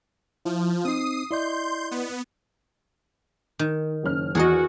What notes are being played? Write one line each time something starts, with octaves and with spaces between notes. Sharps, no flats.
F3 E4
C4 D#4 D#6 C7
E4 D5 D#5 C6 G6
B3
D#3
F#1 C#4 F6
E2 F#4 G#4 A#4 D#5